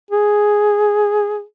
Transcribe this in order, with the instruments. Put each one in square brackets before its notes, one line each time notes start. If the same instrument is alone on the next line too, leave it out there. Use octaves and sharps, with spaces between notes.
[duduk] G#4